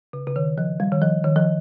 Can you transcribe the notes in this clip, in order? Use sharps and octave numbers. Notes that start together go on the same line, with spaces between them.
C#3
C#3
D#3
F3
G3
D#3
F3
D#3
F3